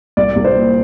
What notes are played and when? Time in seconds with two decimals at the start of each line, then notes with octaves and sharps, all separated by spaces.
0.17 C2 D5
0.36 C2
0.45 C5
0.55 A#2